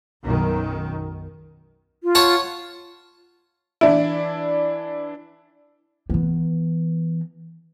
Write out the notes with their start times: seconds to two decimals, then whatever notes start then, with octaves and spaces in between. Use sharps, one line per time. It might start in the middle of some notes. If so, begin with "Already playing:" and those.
0.23 B1 F#2 D#3
2.03 F4
2.15 C#5 F#5 A5
3.81 E3 D4 E4 E5
6.10 E3 B3